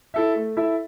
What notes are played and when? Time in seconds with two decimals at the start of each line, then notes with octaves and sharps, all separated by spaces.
0.14 E4 A4 E5
0.35 A3
0.57 E4 A4 E5